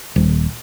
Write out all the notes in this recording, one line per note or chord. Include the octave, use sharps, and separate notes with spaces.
D#1